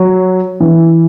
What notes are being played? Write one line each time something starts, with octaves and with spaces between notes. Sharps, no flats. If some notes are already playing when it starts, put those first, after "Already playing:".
Already playing: F#3
E3